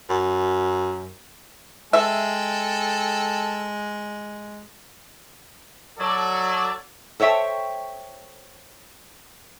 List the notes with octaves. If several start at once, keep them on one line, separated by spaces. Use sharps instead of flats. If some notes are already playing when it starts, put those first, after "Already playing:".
F#2
G#3 A4 E5 G5
F#3 A4 D5
A4 C5 C#5 E5 G5